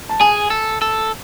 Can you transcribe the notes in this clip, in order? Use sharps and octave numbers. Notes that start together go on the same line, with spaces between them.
A5
G#4 G#5
A4
A4